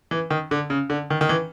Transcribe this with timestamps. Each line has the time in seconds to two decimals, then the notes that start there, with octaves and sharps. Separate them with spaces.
0.11 E3
0.31 D#3
0.51 D3
0.70 C#3
0.90 D3
1.10 D#3
1.21 D#3
1.29 E3